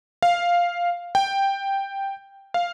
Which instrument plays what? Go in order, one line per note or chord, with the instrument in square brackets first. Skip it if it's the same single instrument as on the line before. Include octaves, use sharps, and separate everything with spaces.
[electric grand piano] F5
G5
F5